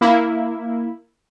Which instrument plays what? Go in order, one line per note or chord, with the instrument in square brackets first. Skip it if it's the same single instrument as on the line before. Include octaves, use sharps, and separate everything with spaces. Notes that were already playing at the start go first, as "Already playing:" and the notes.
[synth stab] A#3 E4